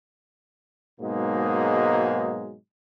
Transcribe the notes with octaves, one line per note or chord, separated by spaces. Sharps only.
G#2 B2 F#3 G#3 A#3 D#4